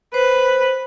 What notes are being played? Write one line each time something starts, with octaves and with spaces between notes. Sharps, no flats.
B4 C5